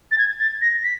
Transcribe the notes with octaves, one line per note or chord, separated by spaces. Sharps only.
A6
G#6
A6
A#6
B6